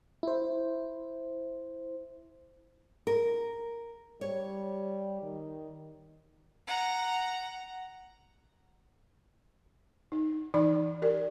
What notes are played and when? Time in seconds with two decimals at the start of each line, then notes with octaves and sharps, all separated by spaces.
0.23 E4 C5
3.07 A#4
4.21 G3 C#5
5.22 D#3
6.67 F#5 A#5
10.12 D#4
10.54 E3 D#4 D5 B5
11.02 G4 A#4 D5